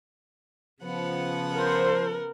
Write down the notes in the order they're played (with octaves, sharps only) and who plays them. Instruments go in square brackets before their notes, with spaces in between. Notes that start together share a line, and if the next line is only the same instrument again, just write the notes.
[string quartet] C#3 B3 F#5 [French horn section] F3
[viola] A#4 [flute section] C5